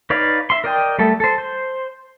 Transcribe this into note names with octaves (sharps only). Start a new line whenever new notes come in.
D#4 B4 C#5 D5 F5
E5 C6
A#4 D5 D#5 G5
G3 A3 A4
A4 C5
C5